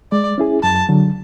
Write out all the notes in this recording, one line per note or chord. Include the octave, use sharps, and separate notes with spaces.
G#3 D5
C#4 E4 G#4
F#2 A5
D3 F#3